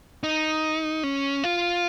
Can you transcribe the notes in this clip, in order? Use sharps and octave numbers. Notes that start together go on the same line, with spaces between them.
D#4
C#4
F4